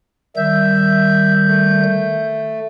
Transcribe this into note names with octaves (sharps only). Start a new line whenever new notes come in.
D#3 G3 E5 G6
A3